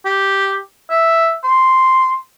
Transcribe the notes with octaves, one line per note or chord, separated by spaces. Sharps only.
G4
E5
C6